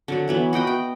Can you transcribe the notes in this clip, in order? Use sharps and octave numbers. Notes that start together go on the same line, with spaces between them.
D3 F#3 F#4
E3 F#3 B3
F#4 D#5 G5 B5
G5